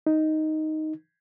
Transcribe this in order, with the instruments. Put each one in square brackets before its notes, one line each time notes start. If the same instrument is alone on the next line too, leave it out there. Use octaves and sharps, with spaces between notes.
[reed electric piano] D#4